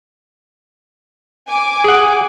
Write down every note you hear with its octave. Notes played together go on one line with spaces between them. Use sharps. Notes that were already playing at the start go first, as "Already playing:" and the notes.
G#5 D6
G#4 F#5